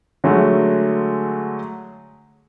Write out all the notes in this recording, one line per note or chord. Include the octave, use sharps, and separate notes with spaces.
D3 F#3 G#3 A3